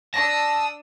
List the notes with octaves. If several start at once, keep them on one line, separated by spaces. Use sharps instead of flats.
D4 A5 D#6 E6 A#6